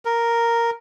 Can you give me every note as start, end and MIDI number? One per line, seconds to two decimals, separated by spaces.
0.05 0.71 70